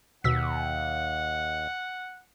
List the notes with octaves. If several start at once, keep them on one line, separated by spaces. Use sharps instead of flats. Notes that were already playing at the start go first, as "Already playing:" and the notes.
D#2 B2 F#5 E6 B6